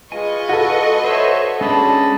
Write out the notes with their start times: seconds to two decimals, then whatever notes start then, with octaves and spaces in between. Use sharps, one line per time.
0.12 G#3 F4 B4 D#5 G#5 C#6
0.49 F#4 A4
1.04 C5 C#5 E5
1.61 G#3 C#4 D4 D#5 A5 B5